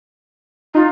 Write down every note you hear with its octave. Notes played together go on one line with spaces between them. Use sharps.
D#4 F4